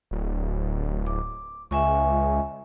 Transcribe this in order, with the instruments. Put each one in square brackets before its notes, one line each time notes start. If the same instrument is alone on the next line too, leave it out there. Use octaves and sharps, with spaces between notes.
[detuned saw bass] D1
[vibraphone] D6
[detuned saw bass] C#2 [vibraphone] E5 G#5 C#6